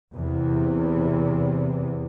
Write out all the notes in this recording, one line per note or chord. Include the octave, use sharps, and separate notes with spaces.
E2 C3